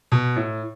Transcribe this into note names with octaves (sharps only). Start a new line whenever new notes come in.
B2
A2